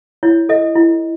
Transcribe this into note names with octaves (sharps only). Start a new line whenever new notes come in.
E4 C#5
A4 D#5
E4